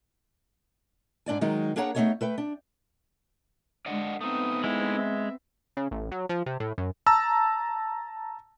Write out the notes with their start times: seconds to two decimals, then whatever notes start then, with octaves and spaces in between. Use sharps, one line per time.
1.26 G#2 D4 D5 G#5
1.41 D#3 F#3 G#3 D#4
1.76 A#3 D4 G#4 C#5 F#5 A#5
1.95 A3 B3 D4 D#4 G#4 C#5
2.21 A3 B4 G5
2.38 D4
3.86 D3 G#3 D5 D#5 F#5
4.21 A3 B3 C4 D#4 D#6
4.64 G#3 E4
4.98 E5
5.77 C#3
5.91 A1
6.12 F#3
6.29 F3
6.46 C3
6.60 A2
6.78 F#2
7.06 A5 A#5 E6